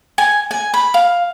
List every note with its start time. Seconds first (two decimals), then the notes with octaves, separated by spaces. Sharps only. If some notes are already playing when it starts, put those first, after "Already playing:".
0.18 G#5
0.51 G#5
0.74 B5
0.94 F5